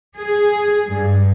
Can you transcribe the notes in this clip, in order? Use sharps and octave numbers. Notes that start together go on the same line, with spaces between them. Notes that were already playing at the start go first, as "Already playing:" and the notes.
G#4
G2